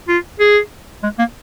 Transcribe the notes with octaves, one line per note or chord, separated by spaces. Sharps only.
F4
G#4
G#3
A#3